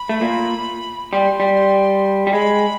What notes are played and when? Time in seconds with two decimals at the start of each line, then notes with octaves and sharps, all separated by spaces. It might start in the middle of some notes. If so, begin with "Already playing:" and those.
Already playing: B5
0.09 A3
0.21 A#2 A#3
1.12 G3 C6
1.40 G3
2.27 G3
2.33 G#3 B5